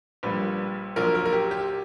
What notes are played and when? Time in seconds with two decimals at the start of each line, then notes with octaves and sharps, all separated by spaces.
0.23 A#1 A#2 G3 B4
0.96 A#1 A#2 F#3 A#4
1.15 A#4
1.25 A#4
1.33 G4
1.51 G4